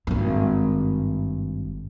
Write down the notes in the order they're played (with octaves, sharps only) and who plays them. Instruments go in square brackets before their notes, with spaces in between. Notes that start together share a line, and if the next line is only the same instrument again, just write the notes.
[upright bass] G#1 G2